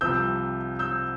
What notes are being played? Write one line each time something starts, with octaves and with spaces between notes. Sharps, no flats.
C2 C3 F3 E6 G6
E6 G6